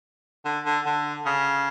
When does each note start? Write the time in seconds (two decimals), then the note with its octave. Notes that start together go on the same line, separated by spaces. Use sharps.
0.45 D3
0.65 D3
0.86 D3
1.26 C#3